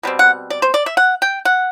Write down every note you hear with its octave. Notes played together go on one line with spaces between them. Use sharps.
B2 G3 C4
F#5
D5
C5
D5
E5
F#5
G5
F#5